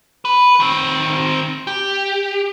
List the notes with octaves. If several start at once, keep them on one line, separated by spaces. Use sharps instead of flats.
B4
D#3 C4
G4